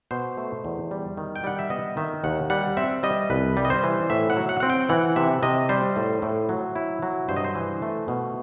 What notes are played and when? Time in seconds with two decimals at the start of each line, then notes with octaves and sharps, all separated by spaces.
0.11 B2 C5
0.37 A3
0.65 E2
0.91 G3
1.17 D#3
1.36 G5
1.44 G3 F#5
1.59 E5
1.70 B3 D#5
1.97 D#3 E5
2.24 D#2 F#5
2.50 G3 F#5
2.77 C4 E5
3.03 G3 D#5
3.30 C2 B4
3.57 G3
3.65 D#5
3.70 C5
3.83 E3
4.10 A2 E5
4.30 F#5
4.37 F#3
4.49 F#5
4.60 C4 F#5
4.70 G5
4.89 E3 F#5
5.16 C3 E5
5.43 C3 D#5
5.69 G3 C5
5.96 A2
6.22 A2
6.49 F#3
6.76 E4
7.02 F#3
7.28 G2 C5
7.36 D#5
7.44 C5
7.55 E3
7.82 A3
8.08 B2